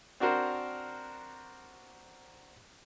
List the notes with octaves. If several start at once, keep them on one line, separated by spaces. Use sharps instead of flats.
C4 D4 F#4 A#4 C5